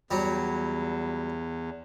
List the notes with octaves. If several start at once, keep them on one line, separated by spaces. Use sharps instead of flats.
E2 F#3 G3